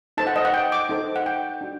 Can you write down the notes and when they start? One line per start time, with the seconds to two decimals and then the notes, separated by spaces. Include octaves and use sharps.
0.17 D#4 A4 C5 A5
0.27 F#5
0.36 D#5
0.45 F#5
0.54 G5
0.72 D6
0.89 D#4 A4 C5
1.16 F#5
1.26 G5
1.61 D4 F#4